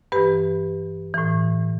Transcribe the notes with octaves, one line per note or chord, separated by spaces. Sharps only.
G2 E3 G4 B4
A2 E3